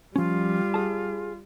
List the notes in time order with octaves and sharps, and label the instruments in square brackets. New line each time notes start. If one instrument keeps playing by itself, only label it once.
[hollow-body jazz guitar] F3 C#4 [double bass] G3 [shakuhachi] F4
[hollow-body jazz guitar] G#4 A5